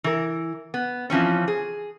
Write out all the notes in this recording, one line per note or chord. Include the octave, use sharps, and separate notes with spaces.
E3 A#4
B3
E3 F3 C4 C#4
G#4